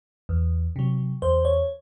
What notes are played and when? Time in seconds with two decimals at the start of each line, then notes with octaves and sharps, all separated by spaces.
0.29 E2
0.76 C3 F#3
1.22 E2 C5
1.45 C#5